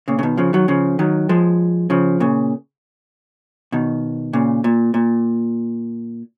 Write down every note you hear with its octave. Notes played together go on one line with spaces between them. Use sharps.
A#2 C#3
C#3
B2 D#3
C#3 F3
D#3 F#3
C#3 F3
D#3 F#3
F3 G#3
C#3 F3
A#2 C#3
B2 D#3
A#2 C#3
A#2
A#2